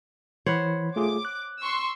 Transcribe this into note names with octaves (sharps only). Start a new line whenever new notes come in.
E3 C5 C#5 F#5 B5
A3 F4 G#4 D6
F#6
C6 C#6 E6